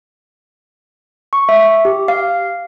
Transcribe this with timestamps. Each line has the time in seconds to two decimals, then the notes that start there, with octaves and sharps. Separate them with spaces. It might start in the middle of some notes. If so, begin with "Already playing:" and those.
1.33 C#6
1.49 E5
1.85 G4
2.08 F5